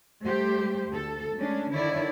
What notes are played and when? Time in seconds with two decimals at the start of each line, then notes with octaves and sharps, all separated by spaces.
0.23 G3 A3 G4 C5
0.88 D2 A4
1.36 G#3 A3 C#4 D4
1.71 D3 D#3 E4 C#5 D5